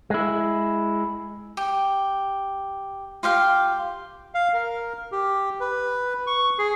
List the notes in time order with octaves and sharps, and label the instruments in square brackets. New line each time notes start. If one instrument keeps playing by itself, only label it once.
[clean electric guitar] G#3 E4
[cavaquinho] G4
F4 G4 F5 G5
[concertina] F5
A#4
G4
B4
C#6
G#4